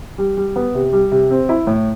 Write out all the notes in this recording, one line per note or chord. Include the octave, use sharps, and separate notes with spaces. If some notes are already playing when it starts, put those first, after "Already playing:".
G3
G3
B3
C3
G3
C3
C4
E4
A2